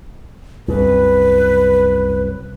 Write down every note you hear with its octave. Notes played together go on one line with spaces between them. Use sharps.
C2 F#2 B4